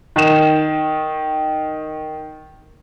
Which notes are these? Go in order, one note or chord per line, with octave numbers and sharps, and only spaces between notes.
D#3 E7